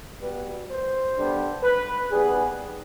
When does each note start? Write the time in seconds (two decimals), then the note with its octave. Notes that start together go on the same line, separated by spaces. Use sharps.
0.21 B2 G3 B3 B4
0.69 C5
1.16 D3 G3 B3
1.64 B4
2.11 D#3 G3 B3 G#4